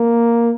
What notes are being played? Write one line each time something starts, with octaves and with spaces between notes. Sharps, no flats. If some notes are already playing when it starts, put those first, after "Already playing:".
Already playing: A#3